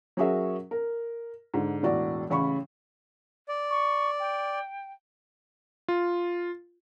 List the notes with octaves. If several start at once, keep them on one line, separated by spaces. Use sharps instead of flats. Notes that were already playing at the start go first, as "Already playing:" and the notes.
F#3 C#4 F#4 G#4 A#4 E5
A#4
G#2 D3
E1 A2 F#4 D5
A1 C#3 B5 C#6
D5
C#6
G5
F4